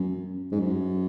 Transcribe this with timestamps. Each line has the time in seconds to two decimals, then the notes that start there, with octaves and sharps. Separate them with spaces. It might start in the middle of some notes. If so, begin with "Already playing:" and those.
Already playing: F#2
0.52 G#2
0.59 F#2